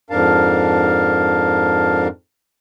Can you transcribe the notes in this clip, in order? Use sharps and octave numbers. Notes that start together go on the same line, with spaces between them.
F2 G#2 D4 A#4 F5 A5